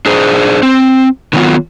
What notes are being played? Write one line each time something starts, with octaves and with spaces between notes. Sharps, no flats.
D4 G#4 C5
C4
D3 D#3 F#3 B3 F4